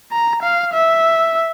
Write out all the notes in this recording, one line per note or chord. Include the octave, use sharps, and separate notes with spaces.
A#5
F5
E5